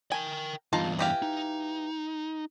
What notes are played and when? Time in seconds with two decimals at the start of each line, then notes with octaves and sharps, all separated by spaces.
0.12 A#4 G5 G#5
0.73 E2 G2 D#4 F4 A5
0.99 E3 G4 F5
1.22 D#4